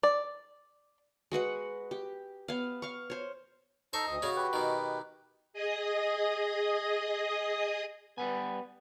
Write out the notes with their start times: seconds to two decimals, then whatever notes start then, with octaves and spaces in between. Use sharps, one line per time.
0.03 D5
1.32 G#3 F#4 B4 F#5
1.91 G4
2.48 B3 F5
2.82 F5 C#6
3.10 C5 C#5
3.93 D#4 A4 C5 A#5 C#6
4.07 D2 D#5
4.22 C#3 C#4 F#4
4.36 G4 B4
4.53 B2 D#3
5.53 G#4 D#5 D#6
8.18 G3 B3 B4 G#5